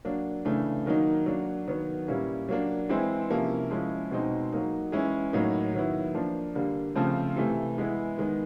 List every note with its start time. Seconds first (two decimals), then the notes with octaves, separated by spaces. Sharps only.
0.05 F#3 A#3 D4
0.45 C#3 E3 A3 D4
0.86 D#3 F#3 A#3 D#4
1.26 F#3 A#3 D4
1.68 D#3 F#3 B3
2.08 A#2 G3 A#3 C#4 E4
2.49 F#3 A#3 D4
2.89 E3 G#3 C4 E4
3.30 C3 F3 A#3 C#4 E4
3.71 F3 G#3 C#4 E4
4.11 B2 G#3 C4 D#4
4.52 F#3 A#3 D#4
4.92 E3 G#3 C#4 E4
5.33 A2 F#3 A#3 D#4
5.74 D#3 F#3 B3 E4
6.15 F3 A#3 D4
6.55 D3 G3 A#3
6.95 C#3 F3 A3 C4
7.36 C3 E3 A3
7.78 E3 G#3 B3 E4
8.18 D#3 G#3 B3